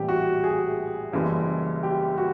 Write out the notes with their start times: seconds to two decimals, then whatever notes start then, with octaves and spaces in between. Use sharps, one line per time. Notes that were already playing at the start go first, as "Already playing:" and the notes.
Already playing: A#1 A2 E3 G3 C4 G4
0.09 F#4
0.44 G#4
1.12 F#1 F#2 C#3 E3 G3
1.83 G4
2.18 F#4